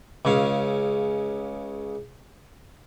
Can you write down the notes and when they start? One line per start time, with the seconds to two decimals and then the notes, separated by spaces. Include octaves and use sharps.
0.25 C#2 C#3 C#4 F5